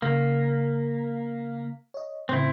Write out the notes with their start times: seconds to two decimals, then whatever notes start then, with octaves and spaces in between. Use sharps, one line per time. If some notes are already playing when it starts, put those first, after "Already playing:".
0.02 C#3 A#3 B6
1.94 C#5 D#5
2.29 A2 C#3 C4 E4